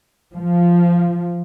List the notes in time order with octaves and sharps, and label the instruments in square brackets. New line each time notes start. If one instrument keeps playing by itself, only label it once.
[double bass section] F3